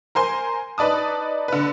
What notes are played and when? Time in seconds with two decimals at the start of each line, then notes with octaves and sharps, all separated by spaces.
0.15 A#4 C5 G#5 C6
0.78 D#4 B4 D5 A5 D#6
1.48 D3 B4